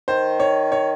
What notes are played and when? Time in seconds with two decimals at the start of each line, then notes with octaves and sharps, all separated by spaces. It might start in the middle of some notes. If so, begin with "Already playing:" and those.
0.08 D#3 C5
0.40 C#5
0.72 C#5